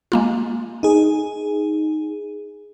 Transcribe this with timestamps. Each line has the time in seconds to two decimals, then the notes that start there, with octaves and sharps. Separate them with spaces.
0.12 G#3 A#3 F4
0.83 D#4 G#4